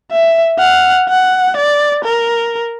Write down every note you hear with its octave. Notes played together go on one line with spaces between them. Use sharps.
E5
F#5 F6
F#5
D5
A#4